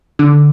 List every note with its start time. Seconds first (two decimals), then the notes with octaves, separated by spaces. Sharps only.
0.19 D3